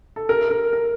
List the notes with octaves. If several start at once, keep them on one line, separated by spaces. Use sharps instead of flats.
A4
A#4
A#4
A#4